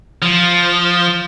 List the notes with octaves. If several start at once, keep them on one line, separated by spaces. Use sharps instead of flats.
F3